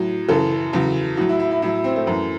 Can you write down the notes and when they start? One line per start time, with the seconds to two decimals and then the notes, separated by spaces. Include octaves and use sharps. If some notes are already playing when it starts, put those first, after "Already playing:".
Already playing: A2 F#3
0.29 F#2 C#3 E3 A4
0.73 E2 C#3 F#3
1.17 A2 F#3 F#4
1.29 E4
1.39 E4
1.51 E4
1.62 A2 F#3 E4
1.84 C4
1.96 A3
2.07 F#2 E3